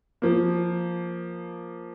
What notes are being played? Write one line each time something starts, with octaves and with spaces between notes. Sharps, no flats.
F3 A#3